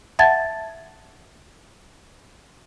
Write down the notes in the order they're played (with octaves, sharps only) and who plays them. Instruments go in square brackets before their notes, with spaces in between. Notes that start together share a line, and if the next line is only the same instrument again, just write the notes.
[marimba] E5 F#5 A5 G#6 A6